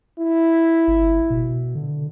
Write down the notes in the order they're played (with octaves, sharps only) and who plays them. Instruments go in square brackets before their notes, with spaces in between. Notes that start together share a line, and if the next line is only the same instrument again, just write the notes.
[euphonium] E4
[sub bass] G1
B2
D3